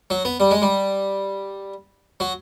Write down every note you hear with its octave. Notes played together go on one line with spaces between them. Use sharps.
F#3
B3
G3
G#3
G3
F#3